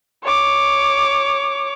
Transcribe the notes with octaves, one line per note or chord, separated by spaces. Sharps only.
C#5 D6